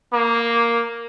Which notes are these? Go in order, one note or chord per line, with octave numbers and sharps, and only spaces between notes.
A#3